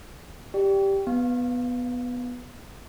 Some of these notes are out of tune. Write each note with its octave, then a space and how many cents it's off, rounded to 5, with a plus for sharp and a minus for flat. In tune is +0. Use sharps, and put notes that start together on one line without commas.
G4 +0 D5 +0 G5 -10
B3 +0 F5 +0